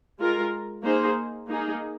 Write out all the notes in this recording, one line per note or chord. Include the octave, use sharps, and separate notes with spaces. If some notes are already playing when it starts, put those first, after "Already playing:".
G#3 F4 A#4
A#3 D#4 G#4 C5
A#3 D#4 G#4